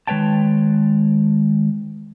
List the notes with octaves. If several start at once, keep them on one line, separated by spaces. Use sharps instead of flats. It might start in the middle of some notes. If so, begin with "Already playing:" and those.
D#3 G#3 B4 C#5 G5 A5